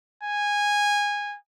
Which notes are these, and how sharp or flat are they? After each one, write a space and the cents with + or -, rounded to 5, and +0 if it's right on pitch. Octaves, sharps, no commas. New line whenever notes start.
G#5 -15